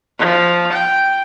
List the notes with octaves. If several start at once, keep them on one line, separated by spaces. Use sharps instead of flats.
F3
G5